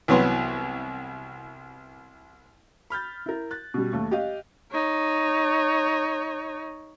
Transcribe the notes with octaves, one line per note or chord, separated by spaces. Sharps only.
C2 E3 F#3 B3 B4 C6
B5 F6 G6 A6
E4 A#4
F#6 A6
B2 G3
D#2 A3
G4 D#5 F5
D#4 C#5